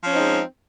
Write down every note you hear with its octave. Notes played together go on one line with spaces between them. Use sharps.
F3 G#3 C4 C#4 D#4